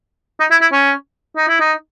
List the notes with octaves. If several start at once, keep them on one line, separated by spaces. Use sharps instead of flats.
D#4
E4
E4
C#4
D#4
E4
D#4